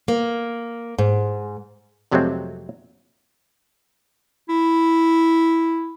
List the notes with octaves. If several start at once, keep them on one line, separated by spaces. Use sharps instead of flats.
A#3
G#2
F2 C3 F#3 G#3 A3 C4
E4